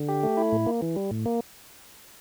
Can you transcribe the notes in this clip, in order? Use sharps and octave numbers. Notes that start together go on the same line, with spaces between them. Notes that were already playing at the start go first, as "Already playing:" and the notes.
Already playing: D3
G4
A3
E4
A2
A#3
E3
G3
A2
A#3